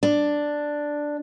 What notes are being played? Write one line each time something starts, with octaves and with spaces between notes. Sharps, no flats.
D4